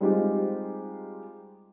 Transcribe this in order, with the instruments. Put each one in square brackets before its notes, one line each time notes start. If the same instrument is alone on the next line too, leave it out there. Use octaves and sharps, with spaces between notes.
[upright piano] G3 G#3 C4 D#4 F4 G4